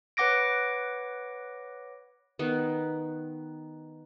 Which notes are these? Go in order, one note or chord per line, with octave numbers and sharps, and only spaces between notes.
B4 C#5 F#5 D6 A#6 D7
D#3 B3